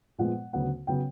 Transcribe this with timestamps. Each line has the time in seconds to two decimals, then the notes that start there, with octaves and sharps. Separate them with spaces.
0.18 A#2 F3 G#3 B3 F#5
0.53 D2 C#3 F#3 B3 F#5
0.87 C#3 F#3 B3 G5